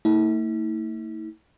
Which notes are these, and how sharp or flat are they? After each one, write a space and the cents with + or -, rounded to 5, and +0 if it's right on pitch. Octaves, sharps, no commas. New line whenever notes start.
A3 +45 E4 -40